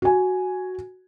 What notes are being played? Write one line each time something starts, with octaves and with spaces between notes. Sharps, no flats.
F#4 G#5